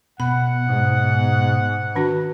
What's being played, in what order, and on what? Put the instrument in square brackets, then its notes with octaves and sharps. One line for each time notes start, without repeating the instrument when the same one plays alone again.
[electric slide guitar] B2 [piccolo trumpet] F#5 [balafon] B5
[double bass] G#2
[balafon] D#3 D4 F#4